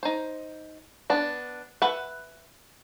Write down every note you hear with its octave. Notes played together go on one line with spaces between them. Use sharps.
D#4 C5
B3 D4
B4 E5 F#5